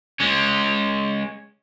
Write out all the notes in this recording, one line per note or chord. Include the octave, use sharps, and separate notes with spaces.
G#3 C#4